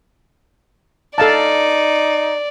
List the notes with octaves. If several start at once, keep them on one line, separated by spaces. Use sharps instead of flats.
D#4 A4 D5 F5 A5